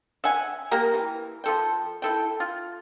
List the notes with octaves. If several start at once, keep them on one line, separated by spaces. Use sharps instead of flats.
E5 F#5 G#5
A#3 G4 A#5
E3
F3 A4 G5
E4 A4 G5
F4